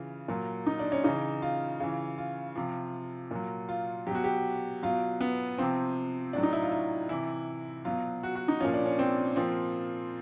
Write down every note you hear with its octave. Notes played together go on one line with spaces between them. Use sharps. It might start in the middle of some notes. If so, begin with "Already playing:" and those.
Already playing: C#3 E3 F4
A#2 F#3
D#4
D4
C#4
C#3 E3 D#4
F4
C#3 E3
F4
C3 F3
A#2 F#3
F4
B2 F#3 F#4 G4
G4
B2 F#3 F4
B3
C3 F3 C4
A2 F#3 D4
D#4
E4
F4
E4
C3 E3 E4
B2 F#3 F4
F#4
F#4
D#4
A#2 F3 C#4
D4
C#4
C4
A#2 F3 C4